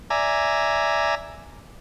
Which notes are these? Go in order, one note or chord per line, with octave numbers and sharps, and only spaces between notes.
D5 E5 G#5 A#5